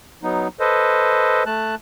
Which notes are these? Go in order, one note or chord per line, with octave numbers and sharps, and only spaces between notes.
F#3 B3 D#4
A4 B4 C5 D#5
A3 A5 F#6